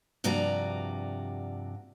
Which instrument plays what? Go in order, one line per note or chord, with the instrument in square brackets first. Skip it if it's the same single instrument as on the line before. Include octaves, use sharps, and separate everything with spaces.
[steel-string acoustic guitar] G2 C3 F3 F#4 D5 A#5